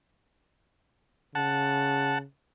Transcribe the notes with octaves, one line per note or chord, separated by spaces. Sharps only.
C#3 F#5 A5